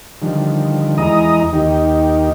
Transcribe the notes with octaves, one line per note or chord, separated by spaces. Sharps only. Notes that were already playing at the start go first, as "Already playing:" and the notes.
D3 D#3 F3 G3
E2 G#3 E4 D#5 A#5 D#6
D#2 D#3 D#4 G4